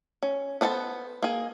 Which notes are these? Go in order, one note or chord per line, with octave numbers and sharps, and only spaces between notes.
C#4
B3 D4 A4 C5 A5
A#3 G#4